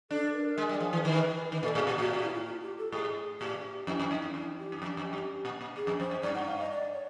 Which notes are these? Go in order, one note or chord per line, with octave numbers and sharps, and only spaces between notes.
D4 A4
B4
A#4
G#3
G3
F3
E3
D#3 B4
B4
D#3 B4
A#2 A4
A2 G#4
A#2 G4
A2 F#4
F#4
E4
F4
F4
G4
A4
G#2 G#4
A2 G4
F2 E4
F2
F#2 D#4
F#2
E2 E4
G4
F#2
F2
F2
G2
A#2
A#2
A#2 G#4
F2
F2 C5
F#2
G2 D5
F#5
F5
D#5
D5
C#5